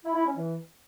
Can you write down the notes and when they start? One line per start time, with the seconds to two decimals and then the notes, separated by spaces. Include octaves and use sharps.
0.04 E4
0.15 E4
0.25 C#4
0.36 E3